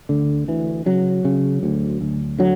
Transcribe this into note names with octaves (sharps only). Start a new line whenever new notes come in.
D2 D3
D2 E3
C#3 F#3
C#3
D2
D2
D3 F#3